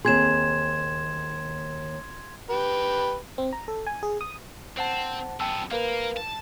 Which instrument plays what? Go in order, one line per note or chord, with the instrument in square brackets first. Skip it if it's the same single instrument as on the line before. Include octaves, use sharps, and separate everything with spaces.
[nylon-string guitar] D#2 C4 G#4 [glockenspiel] C6 G#6 E7
[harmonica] G4 B4
[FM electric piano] C4
A#5
A4
G#5
G#4
D#6
[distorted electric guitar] C4 [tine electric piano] C5 F#5 A5
[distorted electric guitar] F#2 B3 [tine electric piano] G5 A5 E6
[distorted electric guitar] A#3 [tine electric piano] A#4 B4 F5
[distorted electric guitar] A5